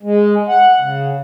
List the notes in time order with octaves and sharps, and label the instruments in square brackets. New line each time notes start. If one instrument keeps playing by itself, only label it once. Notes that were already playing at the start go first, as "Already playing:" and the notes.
[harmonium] G#3
F#5
C#3